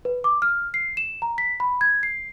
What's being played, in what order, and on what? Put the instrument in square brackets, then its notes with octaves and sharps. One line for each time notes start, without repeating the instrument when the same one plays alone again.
[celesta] B4
D6
F6
C7
E7
A#5
B6
B5
G#6
C7